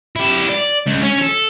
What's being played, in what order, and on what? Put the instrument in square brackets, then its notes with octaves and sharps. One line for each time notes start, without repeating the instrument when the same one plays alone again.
[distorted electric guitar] E4 G4
D5
C#2
C#4 C#5
A4